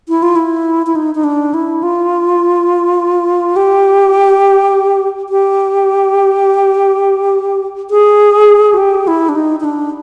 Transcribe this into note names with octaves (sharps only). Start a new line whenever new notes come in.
E4
F4
E4
E4
D#4
D#4
D4
E4
F4
G4
G4
G#4
F#4
G4
E4
D4
D#4
D#4
D4